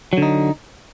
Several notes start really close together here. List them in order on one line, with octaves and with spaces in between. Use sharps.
F#3 D3 D#4